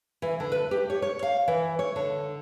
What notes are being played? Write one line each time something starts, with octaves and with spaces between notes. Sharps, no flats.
E3
D3
B4
G4
C#5
C#5
F5
E3
C#5
D3